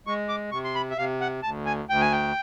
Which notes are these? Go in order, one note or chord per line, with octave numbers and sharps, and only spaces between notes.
G#3 C#6
D6
C3 C#6
C6
B5
E5
C3 F5
F#5
D2 A5
G#5
D2 G5
G#5
G5